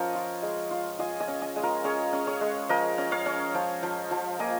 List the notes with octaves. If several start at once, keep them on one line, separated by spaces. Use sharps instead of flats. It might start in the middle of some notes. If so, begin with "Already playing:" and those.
Already playing: F3 C#4 A#4 C#5 D#5 F5
F4
G#3
F4
F4 D#5 G#5
D#5 G#5
C#4
D#5 G#5
G#3
F4 A#4
C#4 G#4 C#5
C#4
G#4 C#5
G#3
F3 A#4 D#5
C#4
C#5 F5
C#4
F3
F3
F3
A#3 D#5 G#5